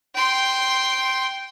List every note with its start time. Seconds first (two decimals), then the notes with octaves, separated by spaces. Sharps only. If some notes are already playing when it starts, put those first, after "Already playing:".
0.15 G5 C6